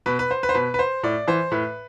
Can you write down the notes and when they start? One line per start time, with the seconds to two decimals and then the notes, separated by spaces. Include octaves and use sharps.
0.06 B2 B4
0.19 B4
0.31 C5
0.43 B4
0.49 C5
0.54 B2 B4
0.74 B4
0.79 C5
1.03 A2 D5
1.27 E3 C5
1.52 A2 B4